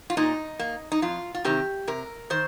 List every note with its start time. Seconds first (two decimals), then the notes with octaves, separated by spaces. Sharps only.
0.10 F4
0.17 A#2 D#4
0.59 A#3
0.92 D#4
1.02 F2 F4
1.34 F4
1.44 C3 D#3 C4 G4
1.87 C3 A#4
2.30 D#3 C5